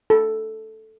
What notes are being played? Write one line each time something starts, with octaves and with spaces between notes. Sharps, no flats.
A4